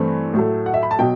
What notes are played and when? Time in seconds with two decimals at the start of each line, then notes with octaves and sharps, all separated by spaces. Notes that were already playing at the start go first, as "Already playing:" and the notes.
Already playing: G2 E3 A3 C4
0.34 A2 F#3 A3
0.66 F#5
0.74 E5
0.83 B5
0.91 A5
0.99 B2 F#3 G5